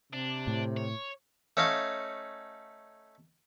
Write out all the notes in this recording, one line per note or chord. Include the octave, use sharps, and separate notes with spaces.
C3 D4
A2
C#5
A3 C#4 D#4 C#5 F5